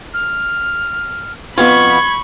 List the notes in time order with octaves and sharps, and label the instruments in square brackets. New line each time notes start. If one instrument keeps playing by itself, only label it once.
[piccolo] F6
[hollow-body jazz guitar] F2 B3 F4 [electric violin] B5 C#6 [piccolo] G#6